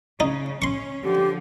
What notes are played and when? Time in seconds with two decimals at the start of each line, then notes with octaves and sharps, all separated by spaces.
0.20 C#3 D#4
0.62 C#4 C6 C#6
1.04 D3 F3 G4